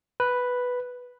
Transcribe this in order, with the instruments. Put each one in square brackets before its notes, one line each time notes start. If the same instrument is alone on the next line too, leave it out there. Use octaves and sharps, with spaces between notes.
[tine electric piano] B4